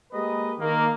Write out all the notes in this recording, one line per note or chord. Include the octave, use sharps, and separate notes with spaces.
G#3 A#3 G4 A#4 B4 D#5
D#3 A#3